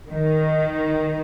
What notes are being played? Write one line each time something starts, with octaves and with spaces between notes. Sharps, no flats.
D#3